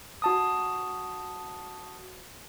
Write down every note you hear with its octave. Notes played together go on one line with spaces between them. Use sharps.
F#4 A5 D#6